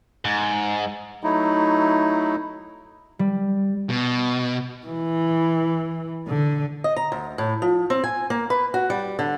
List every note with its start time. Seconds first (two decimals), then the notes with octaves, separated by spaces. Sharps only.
0.25 G#2
1.24 F#3 A3 D#4 E4
3.19 G3
3.90 B2
4.87 E3
6.27 D3
6.84 D#5
6.96 A#5
7.12 D2
7.38 A2
7.62 F3
7.90 C4
8.04 G#5
8.30 A#3
8.50 B4
8.74 F#4
8.90 G3
9.19 D3